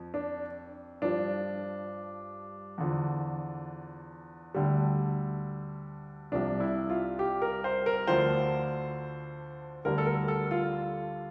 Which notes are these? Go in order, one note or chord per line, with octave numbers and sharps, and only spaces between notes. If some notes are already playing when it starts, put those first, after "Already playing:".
Already playing: F2
D4
G2 F3 D4
E2 D3 F3
D2 D3 G3
C2 C3 F3 D4
E4
F4
G4
A#4
C5
A#4
D2 D3 F3 C5
D2 D3 G3 A#4
A4
A#4
A4
F4